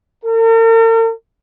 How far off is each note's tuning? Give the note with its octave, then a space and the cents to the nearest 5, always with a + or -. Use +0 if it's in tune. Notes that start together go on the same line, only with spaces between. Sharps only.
A#4 -45